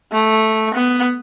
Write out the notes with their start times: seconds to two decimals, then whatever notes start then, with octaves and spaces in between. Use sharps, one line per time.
0.12 A3
0.74 B3